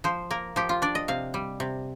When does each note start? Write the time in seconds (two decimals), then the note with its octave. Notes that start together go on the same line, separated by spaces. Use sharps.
0.04 F3 C5
0.31 A#3 A#4
0.56 F3 G4
0.69 F4
0.82 D4 D5
0.95 D#5
1.08 C3 F5
1.34 G3
1.60 C3